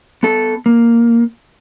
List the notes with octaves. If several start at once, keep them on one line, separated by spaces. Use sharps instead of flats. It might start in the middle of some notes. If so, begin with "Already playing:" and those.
B3 A4
A#3